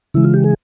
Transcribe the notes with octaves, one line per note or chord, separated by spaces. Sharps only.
C#3 E3 G#3 E4
F4
G4
G#4